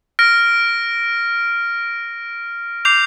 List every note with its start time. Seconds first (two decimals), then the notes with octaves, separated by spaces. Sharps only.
0.19 F6 A#6 D7
2.85 D6 G6 C7 F7